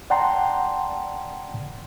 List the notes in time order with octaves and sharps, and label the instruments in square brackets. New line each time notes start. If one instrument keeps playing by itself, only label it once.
[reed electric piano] D5 F#5 G5 A5 A#5 C6